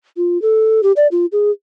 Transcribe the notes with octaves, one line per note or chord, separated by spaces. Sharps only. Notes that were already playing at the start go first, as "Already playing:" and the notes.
F4
A4
G4
D5
F4
G#4